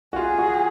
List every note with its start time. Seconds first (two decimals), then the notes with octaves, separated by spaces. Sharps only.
0.13 F#4
0.16 F4 G#4
0.39 F#4